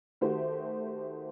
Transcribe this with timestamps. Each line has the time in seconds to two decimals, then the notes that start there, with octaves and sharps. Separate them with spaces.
0.21 D#3 A3 F#4 G4 C5